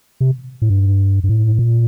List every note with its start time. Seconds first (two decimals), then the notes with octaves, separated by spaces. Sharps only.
0.20 C3
0.62 A2
0.70 G2
1.24 G2
1.29 A2
1.59 A#2